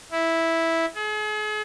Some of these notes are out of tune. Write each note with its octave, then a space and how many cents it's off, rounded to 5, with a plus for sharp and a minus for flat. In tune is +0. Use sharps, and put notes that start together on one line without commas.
E4 -5
G#4 +40